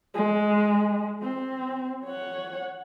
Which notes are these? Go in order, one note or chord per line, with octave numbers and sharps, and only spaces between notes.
G#3
C4
C#5 F#5